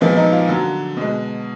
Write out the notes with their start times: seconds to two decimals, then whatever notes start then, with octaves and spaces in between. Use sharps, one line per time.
0.01 A#2 F3 G#3 B3
0.17 D#4
0.32 F4
0.48 D3 F#3
0.97 B2 G#3